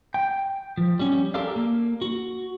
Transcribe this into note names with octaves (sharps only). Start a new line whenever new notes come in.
G5
F3
G3 C#4
G4 A4 A#4 D5 F5
A#3
F#4